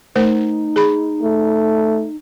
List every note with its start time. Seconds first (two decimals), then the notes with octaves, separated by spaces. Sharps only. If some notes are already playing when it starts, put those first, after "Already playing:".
0.16 A3 D#4 A#4 C5
0.76 G#4 B5
1.23 A3